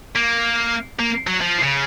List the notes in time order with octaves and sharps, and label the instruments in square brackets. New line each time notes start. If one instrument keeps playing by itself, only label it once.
[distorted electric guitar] A#3
A#3
F#3
F3
C#3